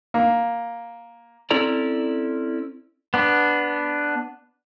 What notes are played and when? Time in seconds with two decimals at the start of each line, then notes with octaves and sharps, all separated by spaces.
0.14 A#3
1.50 C4 C#4 E4 A4 D5 A#5
3.14 B3 D4